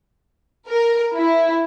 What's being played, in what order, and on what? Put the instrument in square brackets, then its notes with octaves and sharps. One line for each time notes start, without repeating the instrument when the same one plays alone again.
[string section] A#4
E4